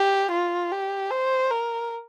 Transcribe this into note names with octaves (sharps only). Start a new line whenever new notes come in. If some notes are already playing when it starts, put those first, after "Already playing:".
Already playing: G4
F4
G4
C5
A#4